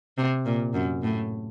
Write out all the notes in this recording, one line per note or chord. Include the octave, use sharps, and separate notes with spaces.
C3
A#2
F#2
A2